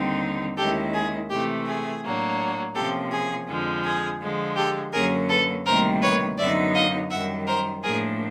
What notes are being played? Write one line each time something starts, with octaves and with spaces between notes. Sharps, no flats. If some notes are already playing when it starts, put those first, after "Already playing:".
Already playing: D#2 D3 G3 C4 D#4
D#2 D#3 G#3 C#4 E4 G4 A4
G#4
C3 E3 A3 G4
G#4
A2 F#3 A#3 D4
C3 F3 A#3 C#4 G4 A4
G#4
F2 D3 F3 G#3
G#4
D3 F3 G#3
G4 A4
F#2 D3 F#3 A#3 C#4 G#4 A#4
A4 B4
D2 C3 D#3 G3 A#3 A#4 C5
B4 C#5
F#2 D3 F#3 B3 D#4 D5 E5
D#5 F5
F#2 D#3 G3 E5 F#5
A#4 C5
A2 F3 A#3 D4 G#4 A#4